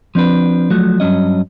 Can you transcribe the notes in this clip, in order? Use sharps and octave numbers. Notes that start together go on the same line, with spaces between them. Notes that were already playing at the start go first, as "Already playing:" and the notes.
F3 C4 D4 B4
F3 F#3 A3
G2 F#3 C#4 D#5